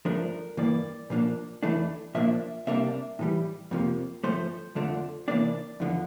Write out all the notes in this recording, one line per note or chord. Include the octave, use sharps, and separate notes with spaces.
G2 F3 A3 D4 A#4
G2 E3 A#3 D5
A#2 F3 A#3 D4
E2 E3 A3 D4
A#2 F3 A#3 D4 E5
C2 C3 G3 A#3 D4 E5
A2 E3 G3
F2 C3 F3 A#3
G2 F3 A3 C5
F2 D3 F3 A3 D4
C3 E3 A#3 D4 D5
E2 D3 F3